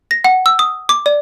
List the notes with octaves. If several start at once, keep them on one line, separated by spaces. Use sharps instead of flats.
A#6
F#5
E6
D#6
D6
D5